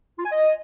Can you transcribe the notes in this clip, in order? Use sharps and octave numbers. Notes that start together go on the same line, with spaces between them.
F4
G#5
D#5